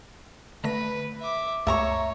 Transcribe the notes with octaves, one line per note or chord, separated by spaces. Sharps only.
D3 A3 B4 A#6
E5 D6
C#2 F#2 A3 C#5 E5 A#5 C#6